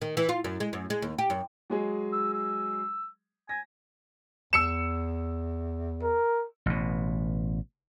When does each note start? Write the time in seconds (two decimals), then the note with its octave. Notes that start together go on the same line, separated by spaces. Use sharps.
0.02 D#3
0.17 E3
0.29 F4
0.44 F#2
0.60 G#3
0.73 F#2
0.90 G#3
1.02 D#2
1.18 G4
1.30 F#2
1.70 F#3 G#3 G#4
2.13 E6
2.34 E6
3.49 G#5 A#6
4.53 E2 E6 C#7 E7
6.02 A#4
6.66 A1 B2